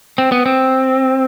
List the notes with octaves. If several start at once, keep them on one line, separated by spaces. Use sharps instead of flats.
C4
B3
C4